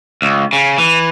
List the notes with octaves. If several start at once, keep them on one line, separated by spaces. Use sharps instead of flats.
C#2
C#3
E3